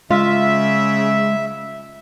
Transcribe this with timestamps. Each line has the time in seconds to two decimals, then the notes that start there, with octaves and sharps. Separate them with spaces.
0.11 C#3 G#3 F4 E5